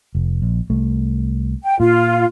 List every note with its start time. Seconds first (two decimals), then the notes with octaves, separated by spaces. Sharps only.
0.15 F1
0.42 A#1
0.70 C2 A3
1.64 G5
1.80 A#2 F4